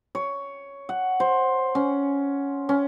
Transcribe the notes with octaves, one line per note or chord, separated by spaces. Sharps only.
C#5
F#5
C5
C#4
C#4